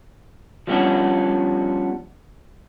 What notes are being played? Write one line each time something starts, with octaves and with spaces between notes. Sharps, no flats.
F3 G3 B3 C#4 D4